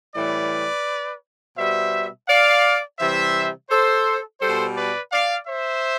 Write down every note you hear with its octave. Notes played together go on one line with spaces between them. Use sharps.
A2 E3 G3 B4 D5
B2 G3 C5 E5
D5 F5
C3 E3 G3 C5 E5
A4 C5
B2 G3 A4 C5
B4 D5
D5 F5
C5 E5